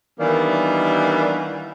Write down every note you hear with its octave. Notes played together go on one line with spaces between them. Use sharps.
D#3 E3 G3 A#3 B3 D4